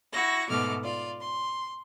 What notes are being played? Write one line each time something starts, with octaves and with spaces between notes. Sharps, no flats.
E4 F#4 C#6 A#6
G#2 B2 A3 D6 F6
F4 D5
C6